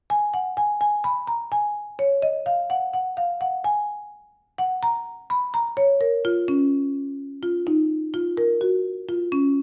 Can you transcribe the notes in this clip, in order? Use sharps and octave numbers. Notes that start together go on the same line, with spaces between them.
G#5
F#5
G#5
G#5
B5
A#5
G#5
C#5
D#5
F5
F#5
F#5
F5
F#5
G#5
F#5
A#5
B5
A#5
C#5
A#4
F4
C#4
F4
D#4
F4
A#4
F#4
F4
C#4